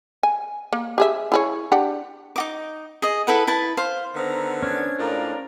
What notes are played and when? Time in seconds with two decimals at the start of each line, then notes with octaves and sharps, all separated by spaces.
0.23 G#5
0.73 A#3
0.98 G4 G#4 E5
1.32 E4 G#4 C#5
1.72 D4 G4 F#5
2.36 D#4 F#4 D6
3.02 G#4 D#5
3.27 E4 A4 B4 F#5
3.47 E4 B4 A5
3.77 C5 F5
4.14 D3 D#3 B3 C5 A#5 E6 F6
4.63 C#4 D4 G#6
4.99 A2 G#3 F4 A#4 D5